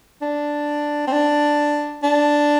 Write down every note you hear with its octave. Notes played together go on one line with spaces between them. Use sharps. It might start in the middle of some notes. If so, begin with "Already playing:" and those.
D4
C4
D4
D4